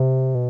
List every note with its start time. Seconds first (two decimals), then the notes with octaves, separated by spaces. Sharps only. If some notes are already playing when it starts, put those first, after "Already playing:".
Already playing: C3
0.35 B2